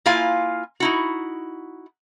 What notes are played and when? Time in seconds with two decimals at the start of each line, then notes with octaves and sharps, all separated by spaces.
0.06 A#3 E4 F4 F5 G#5
0.80 D#4 E4 F#4